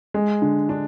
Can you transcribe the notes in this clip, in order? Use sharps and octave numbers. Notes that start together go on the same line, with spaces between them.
G#3
D3
D4